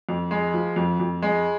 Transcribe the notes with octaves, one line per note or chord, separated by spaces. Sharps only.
F2
G#3
F3
F2
F2
G#3